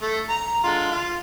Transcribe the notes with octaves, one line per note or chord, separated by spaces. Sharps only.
A3
A#5
D3 G#3 F4
F4